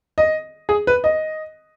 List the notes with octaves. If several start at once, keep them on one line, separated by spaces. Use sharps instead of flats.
D#5
G#4
B4
D#5